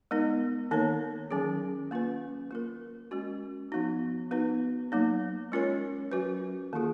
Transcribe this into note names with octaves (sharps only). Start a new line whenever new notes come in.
G#3 B3 D#4 A#4
D#3 A#3 D#4 A#4 C#5
D#3 F#3 C#4 G#4
A#3 C#4 F4 B4
A#3 F4 A#4
G#3 C#4 F#4
F3 B3 D#4 F#4
B3 D#4 F#4 B4
F#3 A#3 D#4
G#3 C#4 F4 A#4 C#5
F#3 C#4 F#4 B4
D#3 A#3 F4 G#4